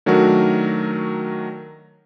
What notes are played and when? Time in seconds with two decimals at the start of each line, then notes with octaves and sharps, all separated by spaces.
0.06 D#3 F#3 A3 D4 F#4 A#4